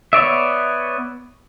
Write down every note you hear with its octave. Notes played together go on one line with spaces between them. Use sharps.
B3 C#5 D5 E5